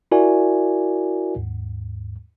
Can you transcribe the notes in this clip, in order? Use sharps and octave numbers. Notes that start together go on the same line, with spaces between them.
E4 F#4 A#4 D5 E5 G#5
D#2 G#2